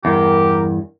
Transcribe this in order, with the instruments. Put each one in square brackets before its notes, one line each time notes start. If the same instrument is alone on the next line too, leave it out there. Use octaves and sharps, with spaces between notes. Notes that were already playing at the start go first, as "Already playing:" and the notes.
[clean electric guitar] E2 G2 [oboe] G4 [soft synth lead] A#4